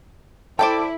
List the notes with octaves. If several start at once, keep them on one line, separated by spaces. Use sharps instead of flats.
E4 A4 C5 D5 G5 D6